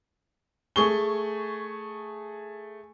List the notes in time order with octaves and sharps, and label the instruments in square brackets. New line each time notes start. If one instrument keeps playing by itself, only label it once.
[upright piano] A3 G#4 C#6 G7